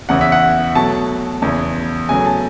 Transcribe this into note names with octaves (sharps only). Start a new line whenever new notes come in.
E2 C#3 E3 F#5
E5
F#5
B2 F#3 A3 A5
E2 C#3 E3
E2 C#3 F#3 A3 G#5
A5